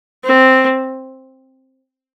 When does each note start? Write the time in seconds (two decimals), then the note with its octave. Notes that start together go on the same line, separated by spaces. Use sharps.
0.25 C4